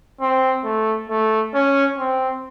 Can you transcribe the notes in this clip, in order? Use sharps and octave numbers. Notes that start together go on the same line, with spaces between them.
C4
A3
A3
C#4
C4